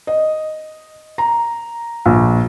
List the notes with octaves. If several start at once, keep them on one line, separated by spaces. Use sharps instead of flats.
D#5
A#5
A#1